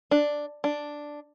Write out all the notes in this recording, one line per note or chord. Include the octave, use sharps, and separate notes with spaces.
D4
D4